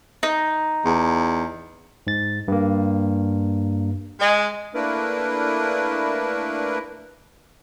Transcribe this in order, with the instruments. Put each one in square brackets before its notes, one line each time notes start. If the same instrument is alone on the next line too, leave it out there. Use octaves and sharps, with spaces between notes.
[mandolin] D#4
[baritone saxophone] E2
[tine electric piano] G#2 A6
G2 A#3
[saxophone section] G#3
[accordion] A3 A#3 D4 E4 A#4 B4